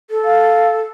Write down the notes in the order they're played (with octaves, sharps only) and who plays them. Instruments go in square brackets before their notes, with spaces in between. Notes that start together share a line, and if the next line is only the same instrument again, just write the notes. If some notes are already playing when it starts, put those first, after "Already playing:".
[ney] A4
[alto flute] F5